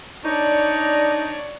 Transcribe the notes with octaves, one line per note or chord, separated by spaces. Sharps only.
D4 D#4 C#5 D5